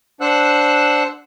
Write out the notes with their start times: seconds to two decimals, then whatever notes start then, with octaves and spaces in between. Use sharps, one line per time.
0.21 D4 C5 F#5 E6 F#6